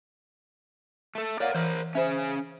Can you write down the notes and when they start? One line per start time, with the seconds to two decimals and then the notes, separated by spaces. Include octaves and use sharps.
1.15 A3 A4
1.40 A#4 C#5 D5 F5 F#5
1.55 E3 A#4 C5 F6
1.95 C#4 G#4 C5 E5